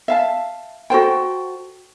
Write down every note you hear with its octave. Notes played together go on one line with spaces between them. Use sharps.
E5 F5 A5
F#4 A4 C5 G5